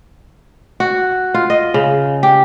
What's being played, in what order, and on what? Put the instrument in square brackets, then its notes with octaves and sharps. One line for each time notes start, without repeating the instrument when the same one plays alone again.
[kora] F#4
F4
D#5
C#3
G4